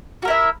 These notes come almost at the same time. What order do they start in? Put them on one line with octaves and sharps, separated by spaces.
F#4 A#4 E4 E5